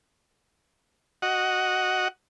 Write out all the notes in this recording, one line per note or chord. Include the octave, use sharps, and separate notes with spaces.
F#4 D#5 F#5